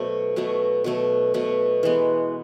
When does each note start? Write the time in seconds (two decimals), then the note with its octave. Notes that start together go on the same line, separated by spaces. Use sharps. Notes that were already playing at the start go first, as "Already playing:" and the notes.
Already playing: B2 F#3 A3 B3 C5
0.36 B2 F#3 A3
0.84 B2 F#3 A3
1.34 B2 F#3 A3
1.83 E3 G#3 B3